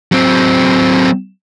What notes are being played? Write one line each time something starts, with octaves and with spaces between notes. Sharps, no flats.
F#3 C4